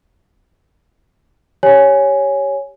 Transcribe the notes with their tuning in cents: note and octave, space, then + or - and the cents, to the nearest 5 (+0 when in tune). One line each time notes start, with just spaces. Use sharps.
G4 +0 C#5 +0 G#5 +0